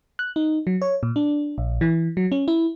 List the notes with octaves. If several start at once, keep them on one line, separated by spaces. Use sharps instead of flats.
F#6
D#4
F#3
C#5
A#2
D4
A#1
E3
F#3
C#4
E4